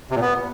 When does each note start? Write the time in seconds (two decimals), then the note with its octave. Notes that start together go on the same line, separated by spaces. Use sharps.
0.11 C3
0.16 A#2
0.21 B3